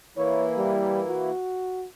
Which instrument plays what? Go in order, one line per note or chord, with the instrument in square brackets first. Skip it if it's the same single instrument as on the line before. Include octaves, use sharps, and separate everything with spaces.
[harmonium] E3 A#3 E4 [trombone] C#5
[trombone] G3
F#4